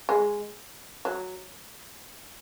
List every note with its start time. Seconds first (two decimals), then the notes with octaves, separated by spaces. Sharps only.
0.09 G#3
1.05 F#3